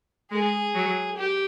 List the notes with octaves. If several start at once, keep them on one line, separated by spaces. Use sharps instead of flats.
G#3 G#4
F#3
G4